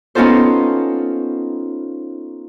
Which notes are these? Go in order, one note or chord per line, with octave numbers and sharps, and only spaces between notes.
B3 C#4 D#4 F4 A4 C5